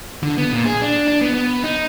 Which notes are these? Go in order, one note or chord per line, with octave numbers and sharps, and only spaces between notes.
D3
B3
A#2
G#4
D4
D4
B3
B3
D#4